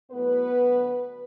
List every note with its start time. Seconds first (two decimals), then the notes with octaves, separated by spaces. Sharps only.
0.10 A2 F#3 B3 B4
0.55 D2 D3 F#3